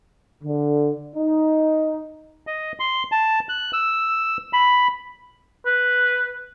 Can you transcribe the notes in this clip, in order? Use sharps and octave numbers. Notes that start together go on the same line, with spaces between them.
D3
D#4
D#5
C6
A5
F#6
E6
B5
B4